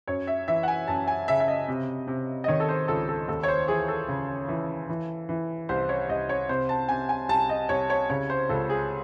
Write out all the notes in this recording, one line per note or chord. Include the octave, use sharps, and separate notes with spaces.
F#2 C#5
E5
E3 E5
F#5
G#5
F#2 A5
G#5
C#3 E5
E5
D#5
C3
C3
D#5
D#3 C#5
A4
C5
C#2 A4
A4
D#2 A4
C#5
C5
E3 G#4
A4
C#3
E3
E3
E3
C2 C5
C#5
C2 D#5
C#5
C3 C5
A5
C3 G#5
G#5
C2 A5
D#5
C2 C#5
C#5
C#3 C#5
C5
C#2 A4
G#4